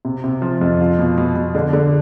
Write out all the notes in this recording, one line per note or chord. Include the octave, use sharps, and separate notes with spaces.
C3
C3
F3
F2
F4
B2
B2
B2
D3
D3